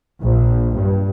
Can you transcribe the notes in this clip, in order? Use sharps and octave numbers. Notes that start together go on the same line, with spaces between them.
A#1
G2